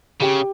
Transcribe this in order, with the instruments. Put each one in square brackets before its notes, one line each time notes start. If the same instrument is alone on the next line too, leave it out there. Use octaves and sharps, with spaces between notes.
[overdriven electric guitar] C#3 [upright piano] G4